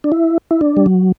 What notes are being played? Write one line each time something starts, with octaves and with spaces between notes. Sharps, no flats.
D4
E4
E4
D4
G3
F#3